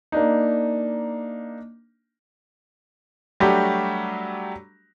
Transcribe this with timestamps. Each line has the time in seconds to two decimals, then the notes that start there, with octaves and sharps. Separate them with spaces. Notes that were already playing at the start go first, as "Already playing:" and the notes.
0.12 A#3 D4 D#4
3.40 F#3 G3 A3 D4 F#4 G4